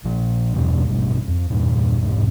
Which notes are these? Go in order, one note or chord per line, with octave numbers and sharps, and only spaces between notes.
A#1 A#2 F3
E2 G2 B2 F3
A1 G2 B2 B3
F2
E2 G2 A#2
E1 C2 G#2